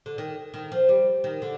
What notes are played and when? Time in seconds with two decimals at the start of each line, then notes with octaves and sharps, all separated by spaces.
0.06 D3
0.18 D#3
0.54 D#3
0.72 F3
0.89 G3
1.24 D#3
1.42 D3